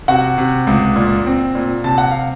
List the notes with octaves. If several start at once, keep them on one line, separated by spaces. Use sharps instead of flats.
C3 F#4 F#5
C3
C#2
A#2
C4
A#2
C3 A5
F#5
F5